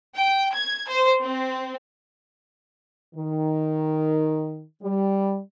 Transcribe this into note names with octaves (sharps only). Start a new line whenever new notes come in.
G5
G#6
C5
C4
D#3
G3